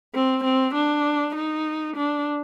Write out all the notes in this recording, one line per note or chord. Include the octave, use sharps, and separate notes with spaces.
C4
C4
D4
D#4
D4